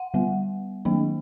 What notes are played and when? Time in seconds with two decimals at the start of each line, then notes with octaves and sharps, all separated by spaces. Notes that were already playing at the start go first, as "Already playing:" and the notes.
Already playing: F#5
0.14 D3 G3 B3
0.85 D#3 F#3 A#3 D4